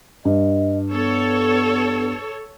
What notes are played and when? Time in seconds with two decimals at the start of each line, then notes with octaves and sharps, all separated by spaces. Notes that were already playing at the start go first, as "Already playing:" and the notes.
0.25 G2 D#5
0.92 B3 A4 C#5